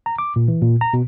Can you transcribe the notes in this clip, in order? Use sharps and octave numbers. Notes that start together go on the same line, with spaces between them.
A#5
D6
A#2
E3
A#2
A#5
B2